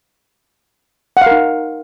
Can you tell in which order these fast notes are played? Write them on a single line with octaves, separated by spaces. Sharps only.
F#5 F5 A#4 D#4